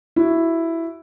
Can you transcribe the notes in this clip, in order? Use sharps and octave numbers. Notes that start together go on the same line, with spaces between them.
E4 F#4